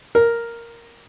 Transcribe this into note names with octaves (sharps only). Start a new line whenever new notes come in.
A#4